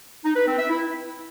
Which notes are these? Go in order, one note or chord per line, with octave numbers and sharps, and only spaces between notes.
D#4
B4
C4
E5
E4